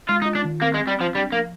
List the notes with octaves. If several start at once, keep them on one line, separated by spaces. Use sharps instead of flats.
G#3 F4
D#4
F4
D4
D#3
A#3 C4
G#3
C4
G3
F3 C4
G3 D4
F3 A#3